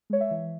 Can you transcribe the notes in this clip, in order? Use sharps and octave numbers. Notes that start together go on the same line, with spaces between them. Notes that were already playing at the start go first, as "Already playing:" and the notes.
G#3 C#5
E5
E3